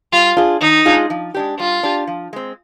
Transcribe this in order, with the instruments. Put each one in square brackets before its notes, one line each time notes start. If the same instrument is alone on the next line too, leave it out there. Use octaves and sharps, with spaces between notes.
[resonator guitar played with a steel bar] G3 [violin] F4
[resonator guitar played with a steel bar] D4 F4 G#4
[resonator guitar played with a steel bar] D#3 [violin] D#4
[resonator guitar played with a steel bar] G#3 D4 F4 G#4
F3
G#3 D4 G4
[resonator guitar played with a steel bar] G3 [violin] F4
[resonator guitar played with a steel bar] D4 G4
F3
G#3 C4